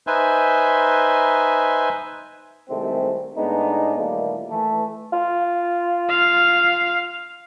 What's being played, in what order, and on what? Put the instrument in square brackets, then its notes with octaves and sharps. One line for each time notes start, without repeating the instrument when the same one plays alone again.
[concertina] D#4 B4 C5 E5 G#5
[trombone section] C2 C3 D#3 G#3 A3 C4
A2 G#3 B3 D4 D#4
A#2 D#3 E3 G3 A3 A#3
E3 A3
[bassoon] F4
[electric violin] F5